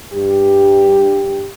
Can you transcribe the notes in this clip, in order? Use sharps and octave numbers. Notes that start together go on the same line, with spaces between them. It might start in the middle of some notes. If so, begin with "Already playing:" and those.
G2 G4